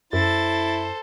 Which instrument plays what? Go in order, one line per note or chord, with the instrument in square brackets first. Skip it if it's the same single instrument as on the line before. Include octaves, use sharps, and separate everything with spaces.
[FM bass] F#2 [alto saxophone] E4 [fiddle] A4 C5 [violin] A6